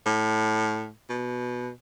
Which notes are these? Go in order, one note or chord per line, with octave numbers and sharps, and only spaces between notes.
A2
B2